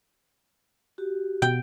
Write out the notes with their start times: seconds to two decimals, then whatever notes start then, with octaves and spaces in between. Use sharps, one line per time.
0.98 F#4 G4
1.42 B2 G5